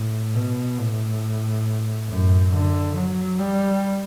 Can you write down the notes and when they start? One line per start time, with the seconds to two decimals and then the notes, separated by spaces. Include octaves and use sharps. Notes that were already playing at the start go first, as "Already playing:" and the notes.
Already playing: A2
0.35 B2
0.79 A2
2.09 F#2
2.52 D3
2.96 F#3
3.39 G3